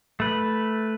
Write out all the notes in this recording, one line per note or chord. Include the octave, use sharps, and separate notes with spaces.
A3 B4